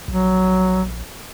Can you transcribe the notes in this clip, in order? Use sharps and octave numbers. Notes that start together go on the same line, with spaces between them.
A#1 F#3